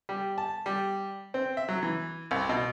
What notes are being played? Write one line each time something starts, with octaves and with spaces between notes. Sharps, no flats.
G3
A5
G3
C4
E5
F#3
E3
C2
B2